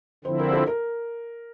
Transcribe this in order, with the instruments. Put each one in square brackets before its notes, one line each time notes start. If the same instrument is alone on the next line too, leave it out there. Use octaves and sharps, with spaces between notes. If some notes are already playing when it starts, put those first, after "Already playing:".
[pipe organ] D3 F3 C4 E4 [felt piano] C5
[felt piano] A#4
A4
A#4